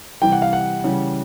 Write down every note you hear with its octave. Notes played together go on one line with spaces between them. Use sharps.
C3 E3 G3 G5
F#5
F5
F#5
C#3 E3 G3